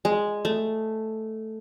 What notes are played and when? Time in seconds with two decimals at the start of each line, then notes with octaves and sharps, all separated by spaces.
0.05 G#3
0.45 A3